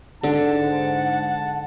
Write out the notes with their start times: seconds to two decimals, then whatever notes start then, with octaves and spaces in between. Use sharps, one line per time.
0.24 G#2 D3 F#5 A5